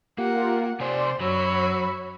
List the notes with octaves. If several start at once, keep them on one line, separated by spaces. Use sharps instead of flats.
A#3 F4 G4 A#4 F#5
C3 G4 C5 D5 G#5 C6
F#2 F#3 F#4 C#5 B5 E6